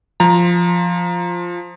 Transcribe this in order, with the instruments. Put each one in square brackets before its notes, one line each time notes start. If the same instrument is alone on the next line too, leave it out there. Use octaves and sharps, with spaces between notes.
[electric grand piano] F3 A#5